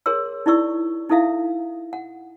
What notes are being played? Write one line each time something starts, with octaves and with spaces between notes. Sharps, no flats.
G#4 A#4 C#5 C6 E6
D#4 E4 D5 C#6 E6
D#4 E4 A4 E5 F5
F#5